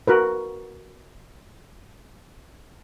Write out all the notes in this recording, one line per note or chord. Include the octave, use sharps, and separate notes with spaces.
F#4 A#4 B4